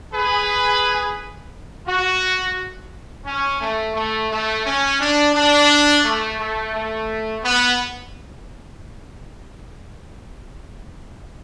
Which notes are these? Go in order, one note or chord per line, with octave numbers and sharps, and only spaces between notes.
G#4 B4
F#4
C#4
A3
A3
A3
C#4
D4
D4
A3
A3
A3
B3